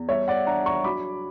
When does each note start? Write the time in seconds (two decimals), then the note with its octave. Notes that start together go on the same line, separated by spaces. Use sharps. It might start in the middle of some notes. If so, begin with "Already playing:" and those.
Already playing: E2
0.09 G3 C#5 E5
0.28 D5 F#5
0.47 D4 F#5 A#5
0.66 A#5 C#6
0.84 F#3 B5 D6